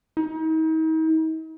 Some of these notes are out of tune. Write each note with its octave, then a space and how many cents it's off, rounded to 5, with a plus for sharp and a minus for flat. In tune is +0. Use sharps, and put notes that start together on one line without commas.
D#4 +40